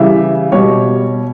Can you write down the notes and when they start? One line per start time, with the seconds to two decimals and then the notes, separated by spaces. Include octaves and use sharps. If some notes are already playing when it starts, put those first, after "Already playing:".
Already playing: C#3 E3 G3 E5
0.52 B2 G3 C#5